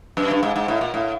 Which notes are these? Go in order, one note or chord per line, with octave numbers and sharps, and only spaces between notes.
F#2
G2
G#2
G#2
A2
A#2
A2